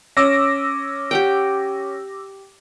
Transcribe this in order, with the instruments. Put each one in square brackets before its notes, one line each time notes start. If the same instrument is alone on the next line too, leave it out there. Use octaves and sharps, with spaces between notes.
[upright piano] C#4 [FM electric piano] D6 E6 A#6
[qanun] G4 F#5 G5